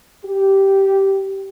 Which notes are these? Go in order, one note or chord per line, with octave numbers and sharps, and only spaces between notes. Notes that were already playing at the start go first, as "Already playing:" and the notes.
G4